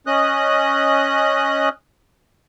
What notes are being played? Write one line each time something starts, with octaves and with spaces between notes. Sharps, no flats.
C#4 D#5 D#6 F#6